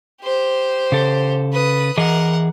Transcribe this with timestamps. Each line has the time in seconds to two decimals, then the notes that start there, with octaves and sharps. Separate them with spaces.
0.22 G4 C5
0.92 C#3 A4
1.52 B4 D#6
1.98 E3 G#4 A#4 D#5 F#5